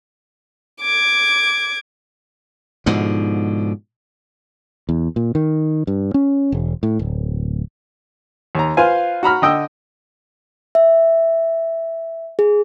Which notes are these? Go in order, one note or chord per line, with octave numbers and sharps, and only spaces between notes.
D6 G#6
G#2 B2 D3 F3
E2
A#2
D#3
G2
C#4
E1
A2
D1
D#2 A#5
F4 B4 C5 F5 G#5
F#4 A#5 B5 F6
D3 D#5 G5 E6
E5
G#4